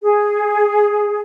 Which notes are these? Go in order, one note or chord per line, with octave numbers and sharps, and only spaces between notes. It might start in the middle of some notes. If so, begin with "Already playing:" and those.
G#4